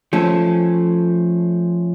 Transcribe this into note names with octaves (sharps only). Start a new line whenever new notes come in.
F3 A3 C#4 A4